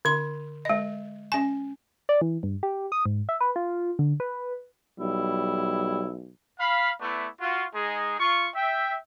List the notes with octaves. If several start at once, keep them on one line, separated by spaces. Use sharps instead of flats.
D3 C6
G#3 D#5
C#4 G#5
D5
E3
G2
G4
D#6
G#2
E5
B4
F4
D3
B4
B1 G3 E4
F5 B5
A3 B3 E4 D5
F4 F#4
G#3 D#4 G#4
F4 C#6
E5 G5